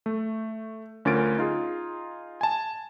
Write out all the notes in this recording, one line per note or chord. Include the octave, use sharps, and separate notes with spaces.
A3
D2 C#4 F4 A#4 A6 D7
D#4 F4 G#4
G#5 A5